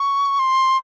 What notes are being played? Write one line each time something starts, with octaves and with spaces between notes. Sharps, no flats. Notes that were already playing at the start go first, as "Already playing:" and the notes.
Already playing: C#6
C6